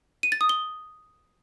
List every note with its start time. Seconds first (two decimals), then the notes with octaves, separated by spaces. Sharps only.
0.23 D#7
0.32 A6
0.41 D#6
0.49 G7